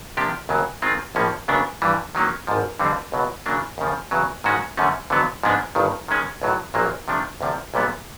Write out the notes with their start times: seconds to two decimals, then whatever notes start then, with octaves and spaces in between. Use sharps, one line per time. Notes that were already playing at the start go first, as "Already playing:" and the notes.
0.17 C3 F3 A#3 D4 G4
0.49 D#2 C#3 F#3
0.82 D#3 G#3 C4 F4
1.15 A#1 A2 F3 A#3 C#4
1.48 D#2 C#3 F#3 B3 D4
1.82 G2 E3 G3
2.15 D#3 F#3 A#3 C#4
2.47 G#1 G#2 F3
2.79 F2 D3 G3 C4
3.12 C#2 B2 F#3
3.46 C#3 F#3 A#3 D4
3.78 D#2 C#3 F3
4.11 E2 C#3 F#3
4.44 G#2 D#3 G#3 C#4 F#4
4.77 F#2 D3 F3 A3 C#4
5.10 F2 D3 F#3 B3
5.43 G#2 F3 G#3 B3 D4
5.75 G1 G2 D#3
6.08 D#3 G#3 C#4
6.42 B1 A2 F#3
6.74 A#1 A#2 F#3 A#3
7.08 C3 F3 A3 D4
7.41 D2 C3 F3
7.74 B1 A#2 G3 B3